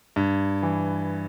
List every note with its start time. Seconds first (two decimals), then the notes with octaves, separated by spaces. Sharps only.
0.16 G2
0.63 E3